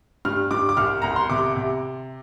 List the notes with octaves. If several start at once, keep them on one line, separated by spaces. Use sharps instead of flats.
G2 F6
G2 D6
D6
C2 F6
C2 A#5
C6
C3 D6
C3